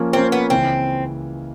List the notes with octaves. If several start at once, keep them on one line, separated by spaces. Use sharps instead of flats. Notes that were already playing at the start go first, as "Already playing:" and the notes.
Already playing: F3 A#3 C#4
F3 A#3 C4 C#4
B3
C#2 C#3 E3 C4